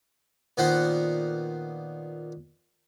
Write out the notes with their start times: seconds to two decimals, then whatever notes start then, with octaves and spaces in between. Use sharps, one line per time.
0.57 A#2 D#3 B3 C5 F#5